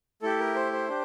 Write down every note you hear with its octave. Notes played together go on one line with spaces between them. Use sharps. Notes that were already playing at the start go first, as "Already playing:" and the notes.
A3 E4 G4 A4
A#4
C5
C5
D4 G4